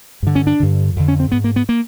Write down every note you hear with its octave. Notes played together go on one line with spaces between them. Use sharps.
G2 D3
C#4
D4
G2 D3
F2 D3
C#4
C4
G#2 B3
A#3
B3
A#3